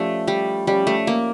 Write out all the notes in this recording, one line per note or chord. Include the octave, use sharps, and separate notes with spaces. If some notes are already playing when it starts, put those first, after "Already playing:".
Already playing: F3 A3 C#4 G4 D5
G3
F3 G3 C#4 G4 D5
A3
A#3